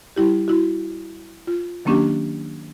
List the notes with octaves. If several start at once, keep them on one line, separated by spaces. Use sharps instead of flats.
G3 E4 G4
E4 F#4
F4
D#3 F#3 A#3 C#4 D4 G4